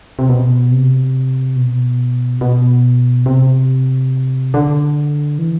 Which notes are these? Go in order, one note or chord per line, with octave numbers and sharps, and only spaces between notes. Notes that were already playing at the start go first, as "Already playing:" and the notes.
C3
B2
C3
B2
B2
C3
D3
E3